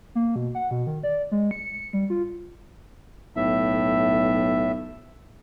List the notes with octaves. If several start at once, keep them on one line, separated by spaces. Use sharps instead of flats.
A#3
B2
F#5
B2
D#3
D5
G#3
C#7
G3
F4
B1 A2 E5